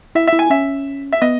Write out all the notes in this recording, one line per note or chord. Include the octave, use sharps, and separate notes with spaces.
E4 E5
E5
E4
G#5
C#4 E5
E5
B3 D#5